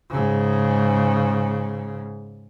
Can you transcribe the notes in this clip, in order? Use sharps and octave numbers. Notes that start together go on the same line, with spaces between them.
G#2 C#3